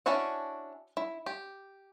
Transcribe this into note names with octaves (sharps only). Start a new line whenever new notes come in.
C#4 D4 E4 F#4 F#5
E4
G4